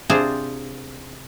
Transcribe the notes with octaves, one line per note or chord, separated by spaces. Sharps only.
C3 C4 D4 F4 G#4 C5